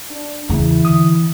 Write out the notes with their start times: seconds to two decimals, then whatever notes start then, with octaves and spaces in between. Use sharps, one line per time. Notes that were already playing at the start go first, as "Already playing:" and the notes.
0.10 D4
0.50 E2 C#3 E3 E4
0.85 D3 D#6